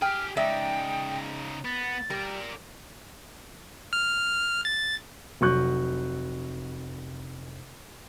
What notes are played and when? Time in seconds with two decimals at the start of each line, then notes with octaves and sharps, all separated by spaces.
0.02 G4 G#4 G5 F6
0.37 C#3 G#3 D#4 D5 E5 G5
1.65 B3 A6
2.10 G3 A#4 D5
3.93 F6
4.65 A6
5.41 F1 F#3 C#6 F#6 G6